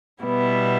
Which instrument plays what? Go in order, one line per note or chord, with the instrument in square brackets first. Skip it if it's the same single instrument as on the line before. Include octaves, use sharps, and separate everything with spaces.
[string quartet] B2 G3 B3 E4